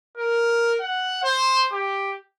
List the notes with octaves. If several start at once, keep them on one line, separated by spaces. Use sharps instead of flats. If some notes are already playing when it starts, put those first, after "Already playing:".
A#4
F#5
C5
G4